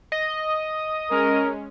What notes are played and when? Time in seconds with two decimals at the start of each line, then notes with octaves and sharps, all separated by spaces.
0.12 D#5
1.11 G#3 C#4 A#4